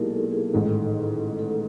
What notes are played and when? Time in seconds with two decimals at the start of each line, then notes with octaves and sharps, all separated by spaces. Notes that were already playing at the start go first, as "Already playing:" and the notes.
Already playing: B1 A#2 G#3 D#4 E4 G4 G#4 A#4
0.10 A4
0.31 G#4
0.53 A1 G#2 D#3 A4
1.39 A4